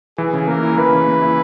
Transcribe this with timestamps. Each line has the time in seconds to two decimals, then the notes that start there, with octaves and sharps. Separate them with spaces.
0.18 E3 G#4
0.33 C#3
0.48 A#3 A#4
0.63 E4
0.78 E3 B4
0.93 C#3
1.08 A#3
1.22 E4